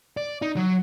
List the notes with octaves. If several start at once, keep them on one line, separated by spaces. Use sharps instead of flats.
D5
D#4
F#3